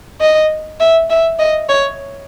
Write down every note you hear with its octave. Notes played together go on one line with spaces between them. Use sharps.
D#5
E5
E5
D#5
C#5